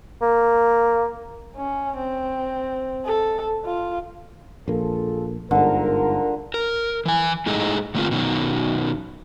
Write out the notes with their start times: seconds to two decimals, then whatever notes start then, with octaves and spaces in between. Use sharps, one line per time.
0.22 A#3
1.57 C#4
1.97 C4
3.06 A4
3.65 F4
4.68 A#1 A#3 F4 G#4 A4
5.51 G1 G#2 D3 F4 A#4
6.54 A#4
7.06 E3 G#5
7.46 A2 G#3 A3 D#4 G#4 A4
7.94 D3 A3 A#3 C4 F4
8.11 B2 D#3 F#3